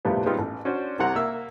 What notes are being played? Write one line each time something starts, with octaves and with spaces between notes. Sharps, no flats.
A#1 F2 A2 C3 G3 B3
G3 G#3 B3 C4 D#4 F4
A1
C#4 D4 F#4 C5 D5
C2 C3 F#5 A#5
A#3 E5 E6